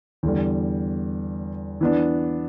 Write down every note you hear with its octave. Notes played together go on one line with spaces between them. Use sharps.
E2 D3 G3
E3 B3 D4